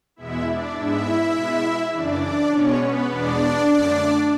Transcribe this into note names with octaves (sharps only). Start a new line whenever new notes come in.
E2 B2 G#3 B3 E4 E5
D4 D5
G#2 G#3 B3 E4 E5
B2 G#3 B3
F#2 C#3 E3 D4 D5
D4 D5
B2 G#3 B3 C#4 C#5
B3 B4
E2 B2 G#3 B3 D4 D5
F#2 D3 A3